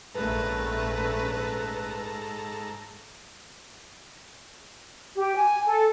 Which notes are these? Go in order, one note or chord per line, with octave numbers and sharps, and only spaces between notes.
A#1 G#2 A3 C#4 A4 B4 A#5
G4
G#5
A4